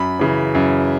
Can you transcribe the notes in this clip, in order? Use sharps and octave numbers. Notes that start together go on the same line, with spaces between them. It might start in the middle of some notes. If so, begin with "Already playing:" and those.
Already playing: F#2 B5
C#3 E3
F#2